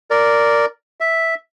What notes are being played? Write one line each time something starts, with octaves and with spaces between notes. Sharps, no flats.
A#4 D5
E5